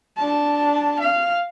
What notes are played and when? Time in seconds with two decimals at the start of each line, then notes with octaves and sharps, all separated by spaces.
0.17 D4 A5
0.99 F5